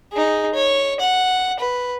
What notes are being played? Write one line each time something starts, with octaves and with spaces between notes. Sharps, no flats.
D#4 G#4
C#5
F#5
B4